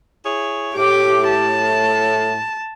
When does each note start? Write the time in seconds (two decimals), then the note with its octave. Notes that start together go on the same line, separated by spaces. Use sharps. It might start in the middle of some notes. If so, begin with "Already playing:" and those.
0.24 E4 G#4 C#5
0.75 A2 G4 D6
1.30 A5